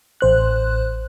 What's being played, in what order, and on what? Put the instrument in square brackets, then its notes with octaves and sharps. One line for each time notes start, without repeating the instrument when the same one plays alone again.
[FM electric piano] A1 C5 F#6